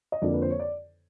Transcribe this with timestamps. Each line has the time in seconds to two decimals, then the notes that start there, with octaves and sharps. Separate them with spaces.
0.12 D#5
0.22 F2 D3 F3 A#3 D5
0.34 B4
0.42 C5
0.50 C#5
0.60 D5